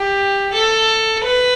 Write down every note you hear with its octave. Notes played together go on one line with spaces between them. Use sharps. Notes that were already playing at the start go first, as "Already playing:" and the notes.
Already playing: G4
A4
B4